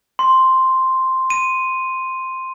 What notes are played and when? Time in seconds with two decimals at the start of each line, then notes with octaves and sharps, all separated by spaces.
0.19 C6
1.30 D#7